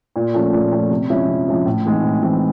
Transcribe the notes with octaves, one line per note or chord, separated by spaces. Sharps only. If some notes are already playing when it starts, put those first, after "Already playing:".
A#2
F3 A3 C#4
A#2
F3 A3 C#4
C3
F3 G#3 C#4 E4
C3
F3 G#3 C#4 E4
A2
E3 G#3 C4 D#4
A2
E3 G#3 C4 D#4